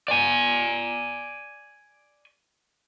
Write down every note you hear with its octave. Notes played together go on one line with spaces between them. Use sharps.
D5 G#5